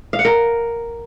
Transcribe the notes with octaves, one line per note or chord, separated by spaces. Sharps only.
F5
F#5
A#4